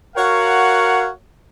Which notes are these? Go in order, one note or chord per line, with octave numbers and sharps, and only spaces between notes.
F#4 A#4 C#5 F5 F#5